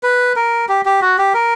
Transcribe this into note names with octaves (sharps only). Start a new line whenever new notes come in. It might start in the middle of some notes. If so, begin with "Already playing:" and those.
B4
A#4
G4
G4
F#4
G4
A#4